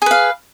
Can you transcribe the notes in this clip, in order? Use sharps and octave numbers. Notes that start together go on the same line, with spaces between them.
G#4 B4 F5